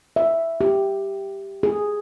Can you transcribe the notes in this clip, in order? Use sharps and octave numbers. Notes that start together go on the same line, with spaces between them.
E5
G4
G#4